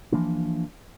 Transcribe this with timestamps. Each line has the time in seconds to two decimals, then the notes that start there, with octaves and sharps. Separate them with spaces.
0.12 E3 F3 A#3 D4